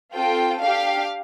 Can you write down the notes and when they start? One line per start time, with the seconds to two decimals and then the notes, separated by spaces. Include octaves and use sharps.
0.13 C4 F4 A4 G5
0.60 D4 G4 F5